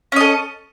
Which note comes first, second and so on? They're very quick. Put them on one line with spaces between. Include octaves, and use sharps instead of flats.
C#4 D#5 A4